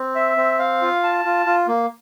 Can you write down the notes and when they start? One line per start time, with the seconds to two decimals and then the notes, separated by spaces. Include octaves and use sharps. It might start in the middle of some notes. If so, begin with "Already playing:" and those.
Already playing: C4
0.15 E5
0.37 C4
0.59 F5
0.82 F4
1.04 A5
1.25 F4
1.46 F4
1.68 A#3